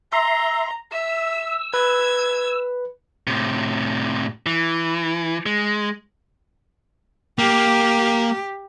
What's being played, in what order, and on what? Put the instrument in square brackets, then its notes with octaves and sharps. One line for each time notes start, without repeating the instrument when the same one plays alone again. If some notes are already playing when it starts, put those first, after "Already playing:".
[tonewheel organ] E5 C6 [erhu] A#5
[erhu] E5 [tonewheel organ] E6
[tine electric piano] B4 [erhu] G#6
[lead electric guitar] A2 C3
E3
G#3
[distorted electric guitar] A#3 [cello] G4